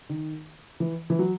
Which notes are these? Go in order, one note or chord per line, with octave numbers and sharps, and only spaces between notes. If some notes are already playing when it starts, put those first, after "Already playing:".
D#3
E3
E3
F#3